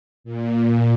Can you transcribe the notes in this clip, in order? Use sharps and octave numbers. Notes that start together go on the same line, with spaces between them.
A#2